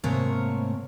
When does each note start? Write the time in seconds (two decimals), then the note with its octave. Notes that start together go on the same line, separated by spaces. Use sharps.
0.04 G#2 C3 A3 A#3 A#4 C#5